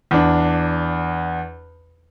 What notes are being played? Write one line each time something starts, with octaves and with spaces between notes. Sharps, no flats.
E2 D4